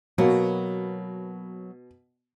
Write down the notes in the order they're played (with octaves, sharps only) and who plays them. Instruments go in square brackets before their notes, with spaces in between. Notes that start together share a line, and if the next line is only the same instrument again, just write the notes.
[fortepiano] B2 [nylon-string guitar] F#3 A#3 B3